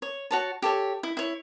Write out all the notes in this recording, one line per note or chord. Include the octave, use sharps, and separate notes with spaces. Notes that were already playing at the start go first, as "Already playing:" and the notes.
C#5
F#4 C#5 A5
G4 A4 C#5
E4
E4 C#5